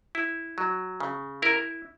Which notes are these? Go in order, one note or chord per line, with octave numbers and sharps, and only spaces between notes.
E4
F#3
C#3
E4 A#4